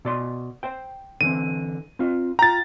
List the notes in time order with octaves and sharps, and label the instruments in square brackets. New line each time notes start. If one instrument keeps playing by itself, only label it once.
[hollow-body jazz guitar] B2 D5 C6
C5 G5
[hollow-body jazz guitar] D3 E3 C4 [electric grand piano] D#7
[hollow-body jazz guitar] C4 F4
[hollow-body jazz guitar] F4 G5 [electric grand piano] A#5 A6